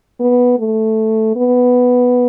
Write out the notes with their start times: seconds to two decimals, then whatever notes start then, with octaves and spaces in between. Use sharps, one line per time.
0.20 B3
0.59 A3
1.36 B3